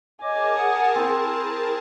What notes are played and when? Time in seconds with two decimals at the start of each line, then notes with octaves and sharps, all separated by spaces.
0.22 G#4 A#4 C#5 D#5 G#5 A5 D6
0.58 F#5 D#6
0.95 C4 E4 C5